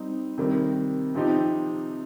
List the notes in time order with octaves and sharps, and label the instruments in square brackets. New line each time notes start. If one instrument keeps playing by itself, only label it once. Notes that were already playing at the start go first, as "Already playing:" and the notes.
Already playing: [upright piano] G3 C4 D#4
C3 D#3 G3
C3 F3 C4 D#4 G4